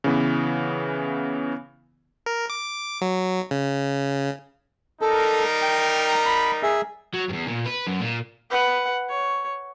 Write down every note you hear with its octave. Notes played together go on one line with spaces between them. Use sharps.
C#3 E3 B3
A#4
D6
F#3
C#3
G3 D#4 A4 A#4
G5
B5
G#4 E5
F#3
E2 G2
A#2
B4
F#2
A#2
B4 F#5
C#5